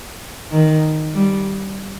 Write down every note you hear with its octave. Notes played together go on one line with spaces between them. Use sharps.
D#3
G3